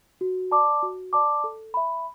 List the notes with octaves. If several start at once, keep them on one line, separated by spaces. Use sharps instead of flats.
F#4
D5 A5 D6
F#4
D5 A5 D6
A4
E5 B5